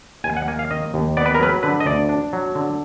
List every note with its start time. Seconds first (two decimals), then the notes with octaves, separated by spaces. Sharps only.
0.24 D#2 G#5
0.37 F#5
0.48 A#3 G#5
0.59 F5
0.71 D#3 D#5
0.94 D#2
1.17 B3 D5
1.26 B4
1.35 A#4
1.40 F#3 B4
1.63 D3 B4
1.80 D#5
1.86 D2 D5
2.09 D4
2.33 F#3
2.55 D3